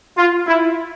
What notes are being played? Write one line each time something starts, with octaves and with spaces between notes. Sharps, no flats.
F4
E4